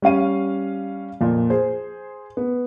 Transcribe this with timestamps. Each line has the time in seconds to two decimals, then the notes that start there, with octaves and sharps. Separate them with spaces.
0.02 G3 C#4 F5 D#7
1.21 F2 A#2 F4
1.50 G#4 C5
2.37 B3